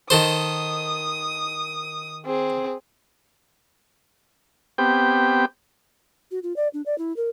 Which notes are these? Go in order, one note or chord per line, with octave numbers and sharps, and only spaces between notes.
D#3 A4 C5 D#6
C4 G#4
B3 C4 G4 G5
F#4
F4
D5
D4
D5
E4
A#4